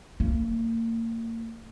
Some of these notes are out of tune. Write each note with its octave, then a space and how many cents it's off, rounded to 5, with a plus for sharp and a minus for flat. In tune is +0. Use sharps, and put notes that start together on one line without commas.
A#3 -35